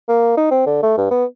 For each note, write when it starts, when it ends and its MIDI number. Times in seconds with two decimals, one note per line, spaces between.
0.09 0.33 58
0.37 0.48 63
0.51 0.64 60
0.66 0.83 50
0.83 0.96 57
0.98 1.08 43
1.11 1.25 59